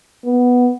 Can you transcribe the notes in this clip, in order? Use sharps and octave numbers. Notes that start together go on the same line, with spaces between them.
B3